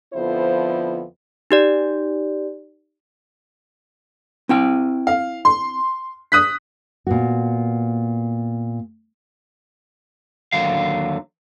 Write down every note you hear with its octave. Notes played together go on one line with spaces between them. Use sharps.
F2 D3 F3 B3 E4 C5
D#4 G4 D5
C4 E4 G5
F5
C6
D#6 F#6 B6
A#2 B3 F#4
D#2 D3 F#3 F5